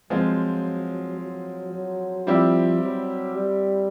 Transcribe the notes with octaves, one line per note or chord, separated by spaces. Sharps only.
F3 F#3 G#3 C4 F4
F#3
F#3
F3 G3 C4 E4 G4
F#3
G3